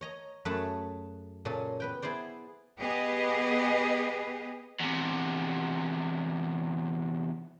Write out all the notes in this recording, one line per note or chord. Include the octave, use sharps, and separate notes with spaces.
C#5 D#5 A#5
F#2 A3 G#4 F#5 A5 B5
A#2 C#3 C#4 A4
B3 B4 G5
B3 E4 G#4 C5 D5
B3 G4 G#4 B4 D#5
E2 C3